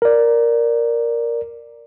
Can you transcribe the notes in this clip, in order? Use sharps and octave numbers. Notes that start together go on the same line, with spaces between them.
A#4 D5